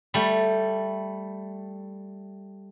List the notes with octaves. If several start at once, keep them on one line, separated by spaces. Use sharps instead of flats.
G3 A3